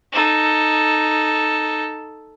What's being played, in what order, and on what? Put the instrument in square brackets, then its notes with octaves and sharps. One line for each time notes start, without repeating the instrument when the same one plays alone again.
[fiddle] D#4 A4